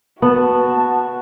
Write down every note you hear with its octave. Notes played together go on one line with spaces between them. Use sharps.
B3 F#4 A5